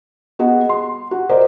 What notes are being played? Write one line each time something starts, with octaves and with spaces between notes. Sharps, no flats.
B3 F#4 G#4 D#5 F#5
C6
F#4
A#4 C5 D5 D#5